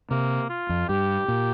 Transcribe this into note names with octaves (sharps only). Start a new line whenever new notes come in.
C3 A#3
F4
F2
G2 G4
A#2